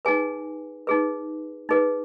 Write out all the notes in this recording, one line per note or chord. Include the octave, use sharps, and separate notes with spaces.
D#4 G#4 B4 G#5
D#4 G#4 B4
D#4 G#4 B4